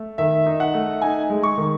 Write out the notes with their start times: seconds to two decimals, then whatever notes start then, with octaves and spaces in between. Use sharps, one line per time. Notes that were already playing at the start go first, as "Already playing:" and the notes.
Already playing: A3
0.18 D#3 E5
0.46 D#4
0.60 F#5
0.74 A3
1.02 D#4 G#5
1.30 G#3
1.43 C#6
1.58 D#3